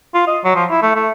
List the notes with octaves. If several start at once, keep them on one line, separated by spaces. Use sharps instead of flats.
F4
D#5
F#3
F3
E4
A3
A3